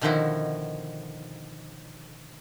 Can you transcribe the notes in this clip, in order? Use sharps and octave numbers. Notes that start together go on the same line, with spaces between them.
B2 D3 D#3 F3 E4 F#4